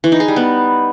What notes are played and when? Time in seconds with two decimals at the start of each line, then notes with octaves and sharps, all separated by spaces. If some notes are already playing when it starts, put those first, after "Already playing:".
0.04 E3
0.12 D#4
0.20 G#4
0.28 G3
0.36 B3